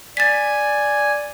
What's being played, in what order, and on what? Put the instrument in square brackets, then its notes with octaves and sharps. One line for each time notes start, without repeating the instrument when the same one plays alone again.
[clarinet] D5 [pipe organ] G#5 [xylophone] A6 B6